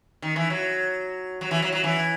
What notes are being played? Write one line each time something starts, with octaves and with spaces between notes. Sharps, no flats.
D#3
E3
F#3
F#3
E3
F#3
F#3
E3